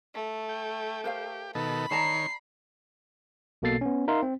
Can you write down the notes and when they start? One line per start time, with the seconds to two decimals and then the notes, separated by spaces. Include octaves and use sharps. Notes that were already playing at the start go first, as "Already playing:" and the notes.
0.14 A3
0.49 G5
1.04 G4 A#4 C5 F5
1.55 B2 D#3 A4 B5
1.91 D#3 C#5 D5 A5 A#5 C7
3.62 B1 B2 A#3 A4 A6 C7
3.81 B3 C#4
4.08 D#4 A#4 E5 F5 C6
4.23 C4